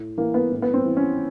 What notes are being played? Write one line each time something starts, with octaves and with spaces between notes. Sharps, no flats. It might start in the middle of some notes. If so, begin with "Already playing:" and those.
Already playing: A2
E3 A#3
B3
A2
B3
C4
E3
C#4